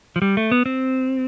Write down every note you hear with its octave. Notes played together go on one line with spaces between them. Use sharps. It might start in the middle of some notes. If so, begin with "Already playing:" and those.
F3
G3
A3
B3
C4